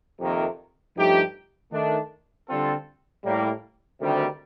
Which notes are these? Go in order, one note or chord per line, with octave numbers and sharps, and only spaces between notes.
F2 C3 D#3 A#3
G2 F3 A3 D#4 G4
D#3 A3 D4
D3 G3 C4 F4 A4
A2 G3 A#3
D2 C3 D#3 G3